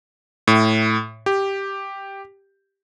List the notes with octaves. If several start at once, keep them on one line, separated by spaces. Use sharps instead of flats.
A2
G4